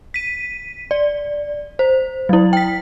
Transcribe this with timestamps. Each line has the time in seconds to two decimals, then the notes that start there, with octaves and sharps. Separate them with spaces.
0.14 B6 D#7
0.91 D5
1.79 C5
2.29 F#3 E4
2.53 G5 B6